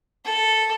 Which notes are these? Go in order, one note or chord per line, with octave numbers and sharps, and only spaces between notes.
A4